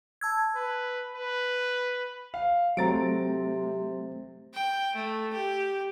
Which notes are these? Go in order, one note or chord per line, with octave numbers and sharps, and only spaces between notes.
A5 E6 G#6
B4
B4
F5
C3 F#3 A3 C4 A#5 A6 D7
G5
A3
G4